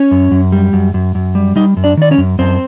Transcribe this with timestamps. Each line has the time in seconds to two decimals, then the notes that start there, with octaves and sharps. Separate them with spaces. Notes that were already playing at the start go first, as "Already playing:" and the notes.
Already playing: C#4 C#5
0.11 F#2
0.31 F#2
0.52 G3
0.73 F#2
0.94 F#2
1.15 F#2
1.35 G3
1.56 G3 D#4 D#5
1.77 F#2
1.84 D4 D5
1.97 D#3 D5
2.11 C#4 C#5
2.18 F#2
2.39 F#2 C4 C5